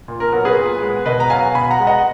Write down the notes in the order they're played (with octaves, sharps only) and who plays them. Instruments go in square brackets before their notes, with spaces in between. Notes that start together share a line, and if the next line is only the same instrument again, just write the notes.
[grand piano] A#2
A#4
F#3 B3 A#4
G#4 B4
A#2
G#3 B3
B2 B4 D#5
A#5
F#3 B3 F5 G#5
B2 G#5 B5
F#5 A#5
G#3 B3
D#5 F#5